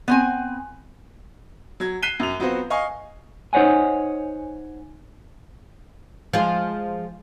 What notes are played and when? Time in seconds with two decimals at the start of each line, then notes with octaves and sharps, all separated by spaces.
0.08 B3 C4 G#5
1.80 F#3 G#6
2.02 F#6 B6 C7 D#7 E7 G7
2.20 F#2 F7
2.39 F#3 B3 C4 F4 F#4 C5
2.70 D#5 F5 G#5 C#6
3.53 D#4 C5 C#5 F#5 G#5
6.33 F3 G#3 F4